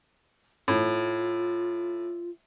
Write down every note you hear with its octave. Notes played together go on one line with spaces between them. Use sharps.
A2 F4